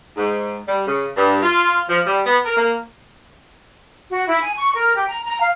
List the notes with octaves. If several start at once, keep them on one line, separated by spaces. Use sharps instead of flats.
G#2
G3
C#3
G2
F4
F3
G3
B3
A#4
A#3
F#4
E4
G#5
C#6
A#4
G4
A#5
A#5
F5